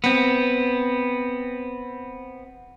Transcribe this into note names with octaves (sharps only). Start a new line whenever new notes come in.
B3 C4